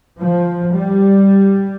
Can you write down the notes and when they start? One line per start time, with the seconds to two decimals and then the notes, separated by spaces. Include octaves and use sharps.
0.19 F3
0.73 G3